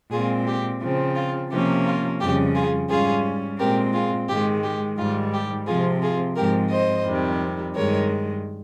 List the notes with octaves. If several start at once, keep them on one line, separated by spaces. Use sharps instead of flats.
A#2 G#3 C4 F4 G#4
G4
C#3 F3 C4
F4
C3 F3 A#3 C#4 G4
F4
F2 C#3 G3 C#4 G4
F4 G#4
G#2 G3 C#4 F4 G#4
A#2 G#3 C4 G4 A#4
F4 G#4
G#2 D#3 G#3 G4
G4
G#2 D#3 G3 F4
G4
C3 F3 C4 F4 G#4
F4 G#4
G#2 F3 G#3 C4 G4 A#4
C5 D#5
F2 C3 D#3 G3
G2 D#3 G#3 A#4 C#5